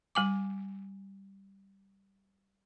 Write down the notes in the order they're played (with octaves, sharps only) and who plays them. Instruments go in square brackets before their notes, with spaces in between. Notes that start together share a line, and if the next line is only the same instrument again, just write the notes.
[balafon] G3 G#5 D6